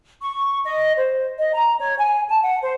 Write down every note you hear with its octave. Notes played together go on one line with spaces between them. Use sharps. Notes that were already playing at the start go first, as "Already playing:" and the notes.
C#6
D#5
C5
D#5
A#5
C#5
G#5
A5
F#5
C5